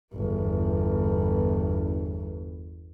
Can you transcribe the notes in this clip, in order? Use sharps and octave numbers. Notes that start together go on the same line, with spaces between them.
G1 E2